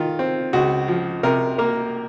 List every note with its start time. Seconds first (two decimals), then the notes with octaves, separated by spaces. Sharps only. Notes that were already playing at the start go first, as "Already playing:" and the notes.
Already playing: D#3 F4
0.19 C4
0.53 C#2 F#4
0.88 F3
1.23 C3 A#4
1.58 A#3 A#4